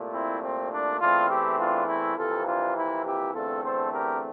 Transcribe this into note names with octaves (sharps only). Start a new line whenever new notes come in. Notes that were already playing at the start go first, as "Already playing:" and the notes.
Already playing: C2 A#2 A3
C4 E4
C4
D4
E2 E3 A3 C4 D4 F4
E4 G4
D4 F4
C4 E4
F2 C3 E3 A#3 F4 A4
D4 F4
C4 E4
E4 G4
E2 D3 A3 C4 F4 A4
A4 C5
G4 A#4